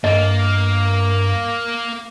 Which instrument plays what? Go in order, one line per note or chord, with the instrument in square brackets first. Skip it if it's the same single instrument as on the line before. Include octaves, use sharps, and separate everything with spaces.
[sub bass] G2 [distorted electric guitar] A#3 [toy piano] D#5